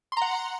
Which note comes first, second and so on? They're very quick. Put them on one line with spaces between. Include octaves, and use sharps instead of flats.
C6 A#5 F#5